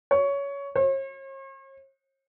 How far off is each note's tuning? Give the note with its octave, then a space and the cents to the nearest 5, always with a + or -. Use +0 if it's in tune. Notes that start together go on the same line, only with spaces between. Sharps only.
C#5 +15
C#5 -45